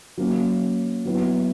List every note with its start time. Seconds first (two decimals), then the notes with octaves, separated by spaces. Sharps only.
0.17 F#3 A#3 C#4
1.05 F#3 B3 E4